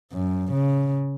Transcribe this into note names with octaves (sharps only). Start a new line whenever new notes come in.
F#2
C#3